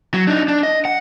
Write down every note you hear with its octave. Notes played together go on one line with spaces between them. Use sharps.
F#3
D4 D#4
D4
D#5
F#5